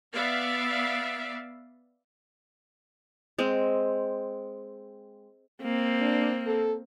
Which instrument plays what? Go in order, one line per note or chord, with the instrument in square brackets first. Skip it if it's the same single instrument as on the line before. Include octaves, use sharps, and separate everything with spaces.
[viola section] B3 D5 E5 F5
[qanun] G#3 C4
[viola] A#3 C4
[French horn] D4
A4